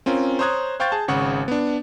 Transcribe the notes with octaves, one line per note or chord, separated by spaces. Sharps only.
C4 C#4 F4 A#4
C5 C#5 A#5 D#6 F#6 G#6
C5 F5 G5 C#6 G6 A6
G#4 A5
G#1 C#3 F#5 C#6
B3 D4